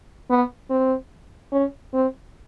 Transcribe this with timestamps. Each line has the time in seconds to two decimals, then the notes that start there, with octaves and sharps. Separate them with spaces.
0.30 B3
0.70 C4
1.52 C#4
1.94 C4